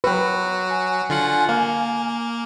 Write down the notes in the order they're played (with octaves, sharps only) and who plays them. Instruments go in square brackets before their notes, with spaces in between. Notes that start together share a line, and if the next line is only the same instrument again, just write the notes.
[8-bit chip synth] F#3 F#4 [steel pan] B4 G5
[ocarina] G#5
[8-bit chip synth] D3 F4 F#5
[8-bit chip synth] A#3 [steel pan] F5